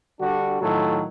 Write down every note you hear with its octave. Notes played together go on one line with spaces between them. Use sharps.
D3 G3 D4 F#4
A2 D#3 F#3 F4 A4